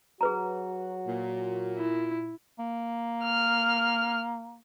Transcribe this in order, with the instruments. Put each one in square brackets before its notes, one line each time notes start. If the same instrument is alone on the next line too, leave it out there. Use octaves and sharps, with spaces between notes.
[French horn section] F#3 F#4 [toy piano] G#4 B4 A#5
[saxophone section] A#2
[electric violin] E4
[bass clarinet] A#3
[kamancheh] F6